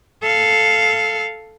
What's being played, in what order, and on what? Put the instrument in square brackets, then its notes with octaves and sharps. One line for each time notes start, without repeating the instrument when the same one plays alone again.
[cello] A4 F5